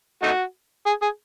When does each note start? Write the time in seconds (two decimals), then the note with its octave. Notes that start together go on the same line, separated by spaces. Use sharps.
0.23 A3 D#4 F#4
0.86 G#4
1.02 G#4